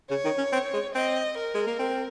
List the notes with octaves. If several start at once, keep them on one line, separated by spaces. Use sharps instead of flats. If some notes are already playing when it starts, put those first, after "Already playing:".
C#3 C#5
D#3
C#4
C4
G#3
C4 D#5
A#4
G#3
A#3
C4